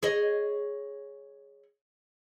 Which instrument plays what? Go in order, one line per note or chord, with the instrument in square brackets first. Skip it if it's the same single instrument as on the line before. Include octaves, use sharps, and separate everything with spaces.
[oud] G#4 C#5 D#5